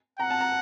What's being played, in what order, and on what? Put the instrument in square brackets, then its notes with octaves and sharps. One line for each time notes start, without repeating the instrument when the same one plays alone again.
[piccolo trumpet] F#5 [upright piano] A#5
[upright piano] A5
A#5